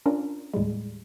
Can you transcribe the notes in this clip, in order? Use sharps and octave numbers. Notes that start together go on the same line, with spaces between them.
C#4 D4 F4 A#4
D#2 A2 G3 G#3